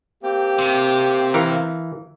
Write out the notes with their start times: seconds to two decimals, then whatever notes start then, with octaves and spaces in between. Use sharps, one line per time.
0.23 A#3 C4 G4
0.58 C3
1.34 E3 A#4 F5